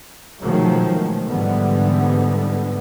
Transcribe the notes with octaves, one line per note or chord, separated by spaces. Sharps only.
B2 D#3 F3 F#3 G#3 A3
G#2 D3 E3 G3 B3